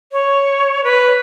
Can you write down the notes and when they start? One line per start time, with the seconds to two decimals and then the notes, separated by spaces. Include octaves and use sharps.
0.12 C#5
0.84 B4